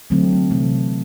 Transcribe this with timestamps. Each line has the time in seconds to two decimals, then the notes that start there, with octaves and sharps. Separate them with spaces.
0.10 D3 F#3 A3 C4
0.50 C3 E3 A3